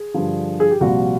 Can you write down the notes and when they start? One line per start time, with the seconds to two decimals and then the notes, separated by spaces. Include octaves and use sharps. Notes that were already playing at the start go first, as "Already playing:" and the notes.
Already playing: G#4
0.14 G2 D3 F3
0.60 G#4
0.71 G4
0.81 C2 A#2 F3 F#4